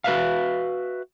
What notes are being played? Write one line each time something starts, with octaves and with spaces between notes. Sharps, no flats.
F#4 B4 E5 F5